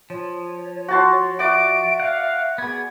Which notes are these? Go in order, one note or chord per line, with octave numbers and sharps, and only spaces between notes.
F3 C#5
F#4 A5 C6
F#4 D5 E5 D7
F5 F#5
B3 G#4 G#6